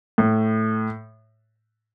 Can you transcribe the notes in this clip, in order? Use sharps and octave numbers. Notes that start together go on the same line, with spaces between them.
A2